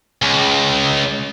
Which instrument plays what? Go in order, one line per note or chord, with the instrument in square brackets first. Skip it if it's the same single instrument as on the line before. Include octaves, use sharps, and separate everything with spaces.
[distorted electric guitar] C#2